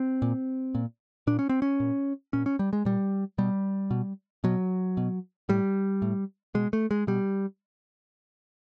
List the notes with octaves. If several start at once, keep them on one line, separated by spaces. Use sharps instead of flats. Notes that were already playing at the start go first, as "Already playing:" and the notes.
Already playing: C4
A#2
A#2
A#2 D4
C#4
C4
C#4
A#2
A#2 C#4
C#4
G3
G#3
A#2 G3
B2 G3
B2
B2 F#3
B2
A2 G3
A2
B2 G#3
A3
G#3
B2 G3